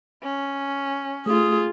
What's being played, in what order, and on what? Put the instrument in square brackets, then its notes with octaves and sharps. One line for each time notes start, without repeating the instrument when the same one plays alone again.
[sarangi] C#4
[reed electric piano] A3 [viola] F4 G#4 [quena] D#6